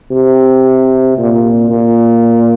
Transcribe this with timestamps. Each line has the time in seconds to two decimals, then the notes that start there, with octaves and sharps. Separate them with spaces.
0.11 C3
1.18 A#2
1.70 A#2